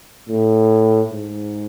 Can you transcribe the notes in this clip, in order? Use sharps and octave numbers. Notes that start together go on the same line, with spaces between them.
A2
G#2